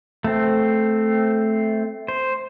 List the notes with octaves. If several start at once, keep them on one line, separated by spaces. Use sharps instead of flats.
A3 C4
C5